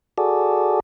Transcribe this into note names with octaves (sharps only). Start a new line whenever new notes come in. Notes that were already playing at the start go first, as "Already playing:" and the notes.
F#4 G#4 A4 D5